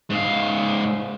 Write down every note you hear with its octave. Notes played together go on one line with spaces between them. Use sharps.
G#2 F5